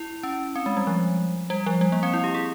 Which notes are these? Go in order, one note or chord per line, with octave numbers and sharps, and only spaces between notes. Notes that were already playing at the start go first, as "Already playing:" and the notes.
Already playing: E4
C#4
C4
G#3
G3
F3
G3
F3
G3
A#3
C4
E4
G4
G#4